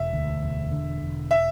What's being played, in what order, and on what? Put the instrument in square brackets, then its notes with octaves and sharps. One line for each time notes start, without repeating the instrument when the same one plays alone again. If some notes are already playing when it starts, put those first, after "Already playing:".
Already playing: [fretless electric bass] E1 [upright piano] E5
[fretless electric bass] D2
E1
D3
E1
[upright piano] E5